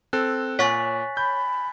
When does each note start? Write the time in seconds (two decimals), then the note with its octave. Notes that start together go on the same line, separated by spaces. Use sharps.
0.13 C4 A4 F#6
0.59 A#2 C#5 F#5 G#5 C#6 A6 B6
1.17 B5 G6